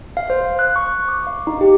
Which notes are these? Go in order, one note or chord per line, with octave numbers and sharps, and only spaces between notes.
F5
C5
F#6
C#6
D6
F5
D#4
G4